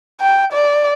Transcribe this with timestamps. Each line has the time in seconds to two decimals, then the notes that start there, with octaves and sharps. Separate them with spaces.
0.21 G5
0.52 D5